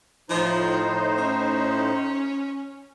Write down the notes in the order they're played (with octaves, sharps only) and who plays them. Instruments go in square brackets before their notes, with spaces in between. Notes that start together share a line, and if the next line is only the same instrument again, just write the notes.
[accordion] A2 D#4 C5 [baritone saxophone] F3
[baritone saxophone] C#4